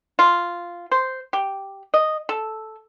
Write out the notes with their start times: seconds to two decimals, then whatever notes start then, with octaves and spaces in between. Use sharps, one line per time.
0.19 F4
0.91 C5
1.33 G4
1.94 D#5
2.29 A4